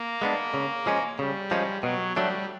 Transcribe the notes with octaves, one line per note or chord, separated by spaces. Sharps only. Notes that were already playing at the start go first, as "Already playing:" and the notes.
Already playing: A#3
G#3 B3 D4
C#3
F3 G#3 C#4
C#3 G3
F3 G#3 C#4
B2 F#3
F#3 G3 A3 D4